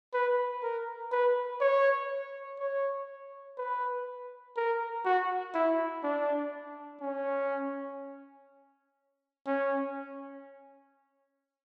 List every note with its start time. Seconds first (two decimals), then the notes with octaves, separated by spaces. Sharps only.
0.13 B4
0.63 A#4
1.12 B4
1.61 C#5
2.59 C#5
3.58 B4
4.56 A#4
5.05 F#4
5.54 E4
6.03 D4
7.01 C#4
9.47 C#4